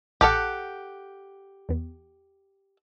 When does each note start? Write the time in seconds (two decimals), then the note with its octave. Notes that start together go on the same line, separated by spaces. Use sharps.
0.21 A#1 G4 A4 F#5 F6 D7
1.69 E2 B3